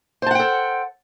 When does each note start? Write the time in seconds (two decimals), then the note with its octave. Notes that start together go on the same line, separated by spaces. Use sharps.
0.22 C5
0.26 A5
0.31 F#5
0.35 G5
0.39 A4